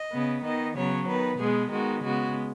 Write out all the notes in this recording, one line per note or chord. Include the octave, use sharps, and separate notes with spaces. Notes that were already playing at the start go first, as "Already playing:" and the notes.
Already playing: D#5
C#3 B3
D#3 B3 D#5
C#3 F#3 B3 C#5
D#3 B3 B4
B2 G#3 B3 G#4
D#3 G#3 B3 F#4
C#3 G#3 B3 F#4